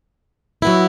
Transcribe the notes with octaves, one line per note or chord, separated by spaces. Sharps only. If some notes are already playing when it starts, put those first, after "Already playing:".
F#3 B3 E4